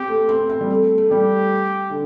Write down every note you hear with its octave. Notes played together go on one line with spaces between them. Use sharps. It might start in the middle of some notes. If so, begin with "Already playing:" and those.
Already playing: C4 G4
A3
C4
C4
G3
A3
A3
G3 G4
D3